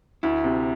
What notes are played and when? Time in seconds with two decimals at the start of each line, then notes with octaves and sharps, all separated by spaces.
0.23 D2 E4
0.44 C3